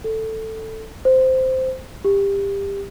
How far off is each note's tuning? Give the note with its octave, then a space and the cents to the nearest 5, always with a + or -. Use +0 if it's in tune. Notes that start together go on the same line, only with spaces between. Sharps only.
A4 +10
C5 -10
G4 +20